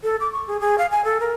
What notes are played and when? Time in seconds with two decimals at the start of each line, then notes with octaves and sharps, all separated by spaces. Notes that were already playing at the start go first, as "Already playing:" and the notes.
0.03 A4
0.20 D6
0.32 C#6
0.47 G#4
0.60 G#4
0.78 F5
0.91 G#5
1.04 A4
1.20 A#4